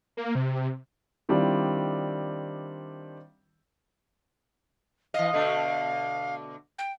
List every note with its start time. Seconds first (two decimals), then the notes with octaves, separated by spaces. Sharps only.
0.17 A#3
0.35 C3
1.29 D#3 G3 C4 D4 E4 F4
5.14 E3 D#5 F5
5.33 B2 D3 A3
6.79 G5